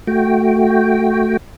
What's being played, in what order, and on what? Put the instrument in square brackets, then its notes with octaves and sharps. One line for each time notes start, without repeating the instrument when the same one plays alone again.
[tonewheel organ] A3 F#4 G5